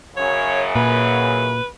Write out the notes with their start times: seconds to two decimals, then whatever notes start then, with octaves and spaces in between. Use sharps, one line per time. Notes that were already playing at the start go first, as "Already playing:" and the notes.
0.17 F#2 C#3 C#5
0.75 A#2 B4